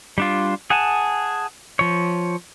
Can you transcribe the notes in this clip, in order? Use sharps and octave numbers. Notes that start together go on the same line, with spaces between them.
G3 D4 F4
G#4 F#5 G#5 A5
F3 C#5